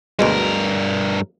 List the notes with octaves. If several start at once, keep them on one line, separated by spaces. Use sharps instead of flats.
D2 G2 B2 G#3 A#4